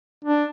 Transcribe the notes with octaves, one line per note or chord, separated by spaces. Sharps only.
D4